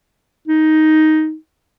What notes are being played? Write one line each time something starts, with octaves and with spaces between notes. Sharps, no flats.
D#4